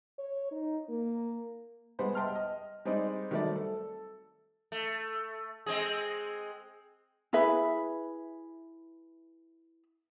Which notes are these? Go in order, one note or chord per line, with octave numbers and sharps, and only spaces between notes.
C#5
D#4
A#3
G3 G#3 B3 B4 C5 F#5
D#5 E5 G5 A5 C6 F6
D#5
G3 G#3 C4 D#4 D5 D#5
D#3 F#3 G3 A3 C4 D5
A4
A3
G#3 C4 G#4
E4 G#4 B4 E5